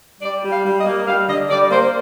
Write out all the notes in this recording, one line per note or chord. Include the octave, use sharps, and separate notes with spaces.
G3 D5
G3
F5
G3
D#5
A#3
G3 F5
D3 D#5
G3 D5
A#3 C5